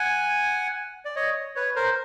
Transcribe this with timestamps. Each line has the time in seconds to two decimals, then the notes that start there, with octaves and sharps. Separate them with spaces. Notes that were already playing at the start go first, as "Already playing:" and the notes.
Already playing: F#5 G#5
1.05 D5
1.16 C#5 D#5
1.55 B4 C#5
1.76 A#4 C5